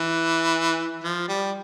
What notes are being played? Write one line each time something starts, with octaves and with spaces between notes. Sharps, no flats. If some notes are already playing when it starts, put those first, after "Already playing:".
Already playing: E3
F3
G3